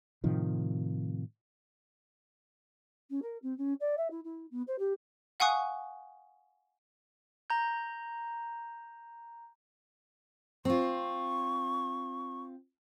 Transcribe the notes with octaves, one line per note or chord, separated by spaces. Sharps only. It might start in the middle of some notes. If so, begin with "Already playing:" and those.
A2 C3 D#3 F3
C#4
A#4
C4
C#4
D5
E5
E4
E4
B3
C5
G4
F5 F#5 G#5 C#6 D#6 F#6
A#5 G6
C4 F4 C#6